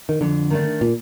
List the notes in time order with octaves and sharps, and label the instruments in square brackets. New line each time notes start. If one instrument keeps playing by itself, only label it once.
[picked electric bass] D#3
[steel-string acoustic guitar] F2 [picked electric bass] D3
[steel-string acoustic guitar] D#3 A3 D4
[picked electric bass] A#2